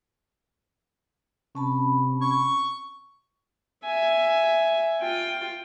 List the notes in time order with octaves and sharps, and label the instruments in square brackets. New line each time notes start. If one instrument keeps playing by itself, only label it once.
[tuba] C3 [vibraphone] C#4 A5 B5
[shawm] C#6
[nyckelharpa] E5 G#5
F4 G5